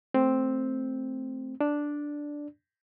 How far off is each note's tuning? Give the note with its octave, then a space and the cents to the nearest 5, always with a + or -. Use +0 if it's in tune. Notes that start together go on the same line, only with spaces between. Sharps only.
A3 +0 C4 +0
D4 +0 D5 +0